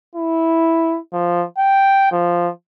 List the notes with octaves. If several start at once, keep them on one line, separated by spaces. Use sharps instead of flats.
E4
F3
G5
F3